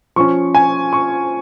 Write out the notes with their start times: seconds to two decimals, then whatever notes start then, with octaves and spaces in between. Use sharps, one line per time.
0.16 F3 C#4 C#6
0.55 G#5
0.93 C#6